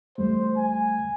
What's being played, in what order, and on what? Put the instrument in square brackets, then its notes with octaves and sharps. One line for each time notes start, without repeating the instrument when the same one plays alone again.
[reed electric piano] E2 G3 A3 [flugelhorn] C5
[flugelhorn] G#5